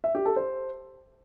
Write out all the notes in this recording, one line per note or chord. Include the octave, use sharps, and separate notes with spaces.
E5
G4
A4
C5